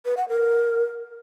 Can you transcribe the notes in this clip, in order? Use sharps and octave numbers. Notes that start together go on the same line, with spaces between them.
B4
F#5
A#4